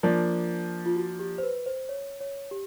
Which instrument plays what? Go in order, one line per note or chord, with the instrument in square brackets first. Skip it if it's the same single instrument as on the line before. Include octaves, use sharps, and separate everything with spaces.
[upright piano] F3 A#3 D4
[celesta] F4
F#4
G4
C5
B4
C5
C#5
C#5
G4